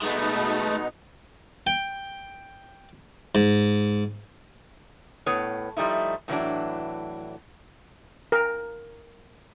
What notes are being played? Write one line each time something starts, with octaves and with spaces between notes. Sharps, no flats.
B2 G#3 A3 B3 D#4
G5
G#2
A2 B3 B4 C#5
F3 G3 A3 D#4 E4
A2 E3 F#3 D4
A#4